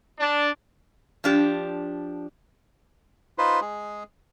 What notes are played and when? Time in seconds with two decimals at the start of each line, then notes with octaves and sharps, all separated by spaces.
0.19 D4
1.24 F3 D4 G4
3.38 D#4 F4 B4 C5
3.61 G#3 G#4